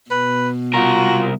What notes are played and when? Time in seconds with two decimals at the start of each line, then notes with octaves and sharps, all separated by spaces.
0.11 B2 B4
0.74 C2 F4 F#4 A#4